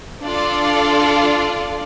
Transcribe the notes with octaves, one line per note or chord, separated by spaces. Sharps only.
D4 F4 A4 D5 F5